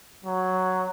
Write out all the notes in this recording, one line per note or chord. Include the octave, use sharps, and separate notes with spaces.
F#3